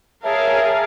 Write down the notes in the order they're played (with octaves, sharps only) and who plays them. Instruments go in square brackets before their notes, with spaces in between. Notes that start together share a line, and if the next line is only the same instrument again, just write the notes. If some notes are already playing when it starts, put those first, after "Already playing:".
[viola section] G#4 A#4 F5 [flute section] C#5 E5 A5